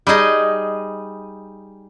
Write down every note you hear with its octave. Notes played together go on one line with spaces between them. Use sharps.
G3 D#4 G#4 D#5